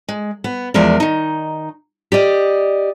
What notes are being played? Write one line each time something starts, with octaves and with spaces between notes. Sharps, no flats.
G#3
B3
E2 F3 G#3 A#4 D5
D#3 D#4
G4 D5 D#5